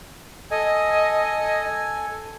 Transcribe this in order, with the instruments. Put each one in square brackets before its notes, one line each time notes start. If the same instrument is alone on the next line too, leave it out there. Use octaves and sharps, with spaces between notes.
[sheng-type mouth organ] A4 G#5 [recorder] D#5